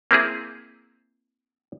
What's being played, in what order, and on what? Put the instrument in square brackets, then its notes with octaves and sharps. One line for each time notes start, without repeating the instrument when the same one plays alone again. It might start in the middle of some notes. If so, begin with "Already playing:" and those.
[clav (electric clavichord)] A#3 C4 E4 G#4